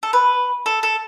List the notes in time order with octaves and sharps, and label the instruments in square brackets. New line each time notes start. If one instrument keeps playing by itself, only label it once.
[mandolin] A4
B4
A4
A4